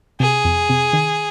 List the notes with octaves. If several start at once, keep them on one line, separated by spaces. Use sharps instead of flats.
C3 G#4
F2
C3
D#3